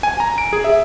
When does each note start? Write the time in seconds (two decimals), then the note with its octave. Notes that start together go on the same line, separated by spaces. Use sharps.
0.03 G#5
0.20 A#5
0.38 D7
0.53 G#4
0.64 E5